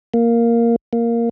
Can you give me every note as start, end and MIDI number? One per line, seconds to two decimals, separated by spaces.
0.14 0.76 58
0.93 1.29 58